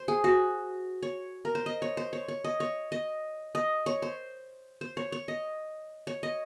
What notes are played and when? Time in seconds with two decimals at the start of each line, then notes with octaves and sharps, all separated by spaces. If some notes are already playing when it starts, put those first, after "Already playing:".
Already playing: C5
0.08 G#4
0.24 F#4
1.03 C#5
1.45 A#4
1.55 C5
1.66 D#5
1.82 C#5
1.97 C5
2.13 C#5
2.28 C#5
2.44 D#5
2.60 C#5
2.92 D#5
3.55 D#5
3.86 C#5
4.02 C5
4.81 C5
4.97 C#5
5.12 C#5
5.28 D#5
6.07 C#5
6.23 D#5